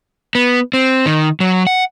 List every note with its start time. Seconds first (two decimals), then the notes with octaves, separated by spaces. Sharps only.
0.35 B3
0.74 C4
1.06 D#3
1.40 F#3
1.67 F#5